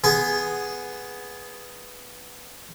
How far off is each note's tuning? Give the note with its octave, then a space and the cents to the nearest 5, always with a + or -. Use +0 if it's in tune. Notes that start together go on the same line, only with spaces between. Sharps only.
B3 +0 G#4 +0 G#5 +0